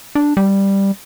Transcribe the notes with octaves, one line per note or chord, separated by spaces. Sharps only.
D4
G3